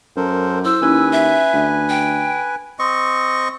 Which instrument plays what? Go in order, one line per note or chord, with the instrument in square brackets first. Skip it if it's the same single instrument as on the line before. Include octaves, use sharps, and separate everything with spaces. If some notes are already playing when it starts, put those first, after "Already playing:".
[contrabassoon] F#2 [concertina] A4 A#4 C5
[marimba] E4 [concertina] C5 [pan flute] E6
[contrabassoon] D#2 [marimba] C#4 E4 [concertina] B4 G#5
[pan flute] E5
[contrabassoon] D2
[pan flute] G5
[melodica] C4 D#5 C#6